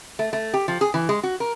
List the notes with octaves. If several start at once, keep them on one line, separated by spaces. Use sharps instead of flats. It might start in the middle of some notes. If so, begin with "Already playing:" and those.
A3
A3
G4
F3
G#4
E3
G#3
F#4
A#4